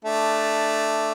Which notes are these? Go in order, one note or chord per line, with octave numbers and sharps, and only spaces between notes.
A3 D4